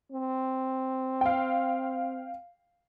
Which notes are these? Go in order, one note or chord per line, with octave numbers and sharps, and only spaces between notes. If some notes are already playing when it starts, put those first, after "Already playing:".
C4
F5 G5